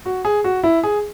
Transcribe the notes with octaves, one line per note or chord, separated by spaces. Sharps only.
F#4
G#4
F#4
E4
G#4